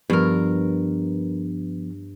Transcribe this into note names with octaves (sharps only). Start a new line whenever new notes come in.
G2 F3 B3 A#4